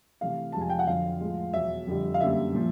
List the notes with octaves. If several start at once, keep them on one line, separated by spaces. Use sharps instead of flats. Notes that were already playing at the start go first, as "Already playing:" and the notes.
C3 E3 A3 F5
F2 C3 F3 G#3 A5
G#5
G5
F#5
F2 D3 F#3 F5
A2 F3 G#3
E2 B2 F#3 E5
F2 D3 G3
F5
F#2 D3 G3 A#3 E5
A#2 F3